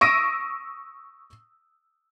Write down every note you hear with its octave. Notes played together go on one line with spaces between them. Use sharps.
C#6 D#6 E6 A#6 D7 D#7